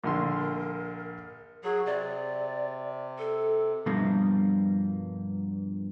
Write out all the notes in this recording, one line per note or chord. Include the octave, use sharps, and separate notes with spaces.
A#1 D3 A#4 C6
F#3 G#4
C3 D5
A4
G2 B2 F3 G3 A#3